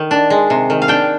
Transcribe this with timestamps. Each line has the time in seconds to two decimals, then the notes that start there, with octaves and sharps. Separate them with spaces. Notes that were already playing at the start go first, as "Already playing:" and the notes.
Already playing: D#3
0.11 D4
0.30 G#3
0.50 C3
0.70 D#3
0.82 F5
0.88 D4 G5